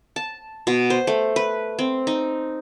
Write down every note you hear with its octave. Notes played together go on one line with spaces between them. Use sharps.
A5
B2
C5
A3
B4
C4
D#4